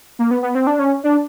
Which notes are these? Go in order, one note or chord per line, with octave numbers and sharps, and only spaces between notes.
A#3
B3
B3
C4
D4
C#4
D4